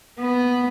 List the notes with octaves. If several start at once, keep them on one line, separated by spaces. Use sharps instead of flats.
B3